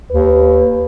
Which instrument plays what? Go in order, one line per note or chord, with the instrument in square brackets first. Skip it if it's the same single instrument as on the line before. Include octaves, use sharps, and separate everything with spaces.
[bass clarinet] D#2 [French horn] B4